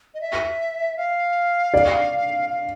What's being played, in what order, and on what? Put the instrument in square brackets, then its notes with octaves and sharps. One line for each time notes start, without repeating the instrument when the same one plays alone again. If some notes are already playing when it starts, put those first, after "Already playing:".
[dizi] D#5
E5
F5
[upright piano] D5
[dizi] F5